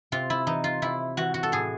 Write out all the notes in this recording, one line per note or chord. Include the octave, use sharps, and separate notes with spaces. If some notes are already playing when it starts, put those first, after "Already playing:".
C3 F4
E4
E3 D#4
F4
C3 E4
E3 F#4
F#4
A4
A2 G#4